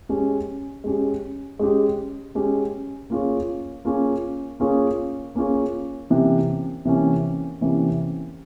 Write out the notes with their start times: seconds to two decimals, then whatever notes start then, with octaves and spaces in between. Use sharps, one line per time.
0.09 G#3 C#4 G4
0.84 G#3 C#4 G4
1.59 G#3 C#4 G4
2.35 G#3 C#4 G4
3.10 A#3 C#4 F4 G#4 C#5
3.85 A#3 C#4 F4 G#4 C#5
4.60 A#3 C#4 F4 G#4 C#5
5.35 A#3 C#4 F4 G#4 C#5
6.10 C3 E3 A#3 C#4
6.85 C3 E3 A#3 C#4
7.61 C3 E3 A#3 C#4